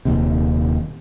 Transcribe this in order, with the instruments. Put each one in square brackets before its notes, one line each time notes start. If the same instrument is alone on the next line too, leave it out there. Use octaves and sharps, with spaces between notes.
[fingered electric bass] D#1 D#2 C3